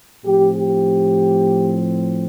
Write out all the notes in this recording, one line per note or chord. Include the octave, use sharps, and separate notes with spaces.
A2 F3 C4 G4
G4